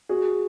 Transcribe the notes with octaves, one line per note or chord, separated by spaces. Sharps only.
F#4 G#4